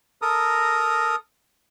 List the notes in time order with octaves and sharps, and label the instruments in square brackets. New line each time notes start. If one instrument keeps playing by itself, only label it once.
[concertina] A4 A#4 A#5 D#6